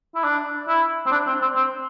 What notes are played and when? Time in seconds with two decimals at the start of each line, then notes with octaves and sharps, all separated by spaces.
0.15 E4
0.24 D4
0.68 E4
1.06 C4
1.12 D4
1.27 C4
1.42 C4
1.56 C4